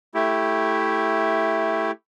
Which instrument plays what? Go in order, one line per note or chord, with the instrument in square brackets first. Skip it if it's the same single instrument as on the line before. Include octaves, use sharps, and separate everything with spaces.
[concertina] A3 E4 G4